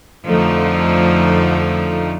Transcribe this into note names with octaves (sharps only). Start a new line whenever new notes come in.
F2 D3 F3 A3 D#4